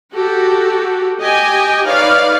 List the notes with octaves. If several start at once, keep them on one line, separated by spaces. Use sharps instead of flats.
F#4 G4 A4
G4 D#5 G5 G#5
D#4 B4 C#5 D5 F5